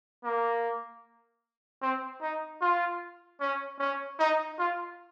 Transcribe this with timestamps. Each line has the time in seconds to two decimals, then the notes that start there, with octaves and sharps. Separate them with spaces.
0.24 A#3
1.82 C4
2.21 D#4
2.61 F4
3.40 C#4
3.79 C#4
4.19 D#4
4.59 F4